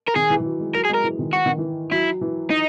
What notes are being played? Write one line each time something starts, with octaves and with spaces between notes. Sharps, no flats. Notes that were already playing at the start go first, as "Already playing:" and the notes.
A#4
D#3 G#4
E3
E3
F#3
G#3
F#3 A#4
G#4
G#3 A#4
E3
D#3
E3 F#4
D#3
E3
F#3 E4
E3
D#4